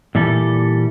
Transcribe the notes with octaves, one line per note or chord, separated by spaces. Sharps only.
A#2 E3 G3 A4